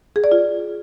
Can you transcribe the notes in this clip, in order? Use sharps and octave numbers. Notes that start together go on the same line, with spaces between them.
G#4
D5
F4